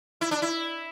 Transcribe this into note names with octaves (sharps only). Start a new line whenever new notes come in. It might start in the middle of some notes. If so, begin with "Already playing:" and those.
E4
D4
E4